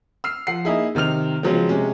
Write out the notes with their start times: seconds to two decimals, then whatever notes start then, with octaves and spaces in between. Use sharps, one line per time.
0.24 E6 F6 C7
0.47 F3 F#5 C7
0.65 A#3 D#4 E4 G#4
0.95 C3 D#3 C4 F6 F7
1.43 C#3 F3 F#3 G#3 B3 C4
1.69 C3 G#3 C#4